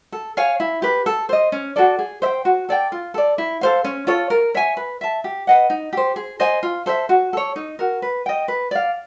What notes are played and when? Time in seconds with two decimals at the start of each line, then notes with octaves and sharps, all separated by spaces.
0.12 A4
0.37 C#5 F5 G#5
0.60 E4
0.82 G4 B4
1.06 A4
1.29 C5 D#5
1.52 C#4
1.76 F#4 A4 D5
1.99 G#4
2.22 C5 E5 G5
2.45 F#4
2.69 A4 D5 G5
2.92 F4
3.14 A4 D5
3.38 E4
3.61 A4 C5 F5
3.84 C#4
4.07 F4 A4 C#5
4.30 A#4
4.55 C#5 E5 G#5
4.77 B4
5.01 E5 A5
5.24 G4
5.47 B4 D#5 F#5
5.70 D#4
5.93 G4 C5
6.16 G#4
6.40 C5 D#5 G#5
6.63 F4
6.86 A4 C5 E5
7.09 F#4
7.33 A4 C#5
7.56 D#4
7.79 F#4 A#4
8.02 B4
8.26 D#5 G5
8.48 B4
8.71 D5 F5